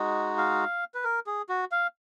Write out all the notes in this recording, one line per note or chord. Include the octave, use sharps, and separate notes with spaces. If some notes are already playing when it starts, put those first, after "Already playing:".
Already playing: G#3 D#4 F#4
F5
B4
A#4
G#4
F#4
F5